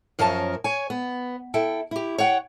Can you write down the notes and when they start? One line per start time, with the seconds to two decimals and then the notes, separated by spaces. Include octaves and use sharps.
0.19 F#2 F3 C#4 A#4 A5
0.64 C#5 G#5
0.90 B3
1.54 E4 A4 G5
1.91 E4 G4
2.18 C#5 F#5 G5